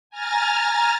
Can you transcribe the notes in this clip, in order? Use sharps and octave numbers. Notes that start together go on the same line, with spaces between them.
G#5 A#5 F6 A6